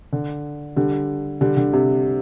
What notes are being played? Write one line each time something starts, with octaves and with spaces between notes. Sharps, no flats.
D3
D3 G3
D3 G3
D3
C3